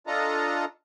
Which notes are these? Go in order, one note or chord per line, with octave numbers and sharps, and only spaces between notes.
D4 F4 A4 D#5 A5 A#5